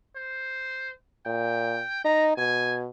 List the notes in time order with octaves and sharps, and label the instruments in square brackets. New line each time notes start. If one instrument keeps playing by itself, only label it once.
[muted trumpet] C5
[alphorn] A#2 [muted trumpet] G5
[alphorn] D#4 [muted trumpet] A#5
[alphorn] B2 [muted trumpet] G#5